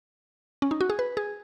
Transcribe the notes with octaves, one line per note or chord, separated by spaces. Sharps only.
C#4
D#4
F#4
G#4
B4
G#4